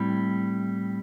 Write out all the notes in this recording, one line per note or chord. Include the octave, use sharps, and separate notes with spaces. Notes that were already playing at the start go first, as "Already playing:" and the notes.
Already playing: A2 G3 C4 E4